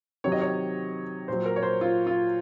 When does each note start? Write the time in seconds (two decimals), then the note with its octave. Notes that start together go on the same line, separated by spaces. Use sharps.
0.24 C3 D#3 F#3 C#5
0.32 D#5
0.42 C#5
1.28 A#2 F#3 C5
1.45 A#4
1.56 C#5
1.63 C5
1.81 F4
2.07 F4